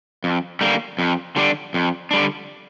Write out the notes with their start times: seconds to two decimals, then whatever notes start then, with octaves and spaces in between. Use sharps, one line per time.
0.24 F2
0.61 D3 G3 A#3
0.99 F2
1.36 D3 G3 D4
1.74 F2
2.11 D3 G3 D4